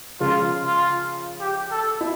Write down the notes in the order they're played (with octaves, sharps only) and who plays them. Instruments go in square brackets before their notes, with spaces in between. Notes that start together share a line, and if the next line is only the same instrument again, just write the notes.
[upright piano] C#3 F3 G#3 [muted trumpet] F4
[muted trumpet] F4
G4
A4
[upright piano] E4